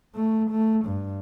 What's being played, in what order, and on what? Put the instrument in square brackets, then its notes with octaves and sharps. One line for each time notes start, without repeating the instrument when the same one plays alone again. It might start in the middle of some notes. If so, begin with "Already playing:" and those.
[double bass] A3
A3
G2